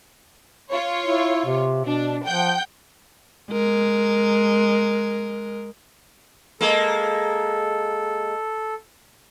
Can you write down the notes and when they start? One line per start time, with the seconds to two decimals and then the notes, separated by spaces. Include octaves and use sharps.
0.70 F4 C#5
1.03 E4
1.46 C3
1.85 B2 D4
2.26 F3 F#5 G5 G6
3.51 G#3 A#4
6.61 G#3 A#3 A4